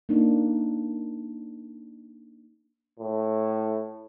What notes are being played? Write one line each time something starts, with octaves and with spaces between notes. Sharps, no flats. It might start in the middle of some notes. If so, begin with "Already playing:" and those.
A#3 D4 D#4
A2